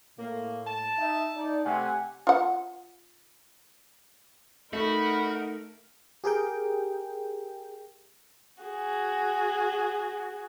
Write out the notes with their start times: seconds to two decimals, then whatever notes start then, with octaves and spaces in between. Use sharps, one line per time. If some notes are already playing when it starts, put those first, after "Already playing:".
0.19 A2 A#3
0.66 A5
0.99 D#4 E5
1.36 D#4 D5
1.66 C3 A3 G4 F#5 G#5
2.27 F4 F#5
4.73 A3 D#4 F#4 A#4 B5
6.24 G4 G#4 A#4 G5
8.63 F#4 G#4